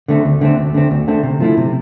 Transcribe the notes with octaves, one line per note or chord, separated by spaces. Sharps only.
D3 A3 C4
D2
D3 A3 C4
D2
D3 A3 C4
D2
D3 A3 C4
C3
F3 A3 E4
C3